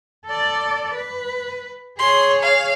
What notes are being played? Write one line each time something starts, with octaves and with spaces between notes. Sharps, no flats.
A4 D5
B4
G#4 C#5 C6
F5